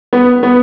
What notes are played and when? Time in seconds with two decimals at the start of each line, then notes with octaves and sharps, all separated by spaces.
0.13 B3
0.43 B3